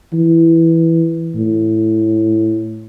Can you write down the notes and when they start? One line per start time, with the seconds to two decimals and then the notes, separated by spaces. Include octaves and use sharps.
0.13 E3
1.35 A2